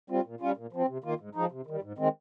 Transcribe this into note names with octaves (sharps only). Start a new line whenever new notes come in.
G3 C4 F4
A#2
G3 C#4 F4
A#2
F3 C4
C3
D#3 A#3 F4
G#2
F3 G#3 D#4
C3
D#3 G3
G#2
D#3 G#3 C4